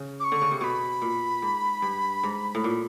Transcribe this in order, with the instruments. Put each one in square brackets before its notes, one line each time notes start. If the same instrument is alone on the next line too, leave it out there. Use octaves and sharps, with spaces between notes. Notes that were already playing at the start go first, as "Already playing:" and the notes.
Already playing: [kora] C#3
[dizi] D6
C#6
[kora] D3
C#3
C3
[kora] B2 [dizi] B5 C#6
[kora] A#2
G#2
G2
G#2
A2
A#2